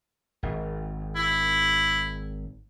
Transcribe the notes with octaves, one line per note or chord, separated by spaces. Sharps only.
G#1
E4